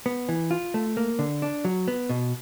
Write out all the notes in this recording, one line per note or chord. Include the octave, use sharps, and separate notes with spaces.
B3
E3
F4
A3
A#3
D3
D4
F#3
B3
B2